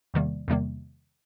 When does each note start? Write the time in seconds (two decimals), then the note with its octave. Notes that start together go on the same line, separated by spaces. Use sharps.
0.14 E2 C3 D#3 G3 A#3
0.48 E2 C3 D#3 G3 A#3